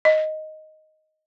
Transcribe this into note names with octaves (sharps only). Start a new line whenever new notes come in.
D#5